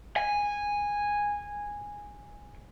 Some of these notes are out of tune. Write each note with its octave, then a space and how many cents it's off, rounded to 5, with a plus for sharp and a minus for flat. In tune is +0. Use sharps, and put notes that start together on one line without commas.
G#5 -10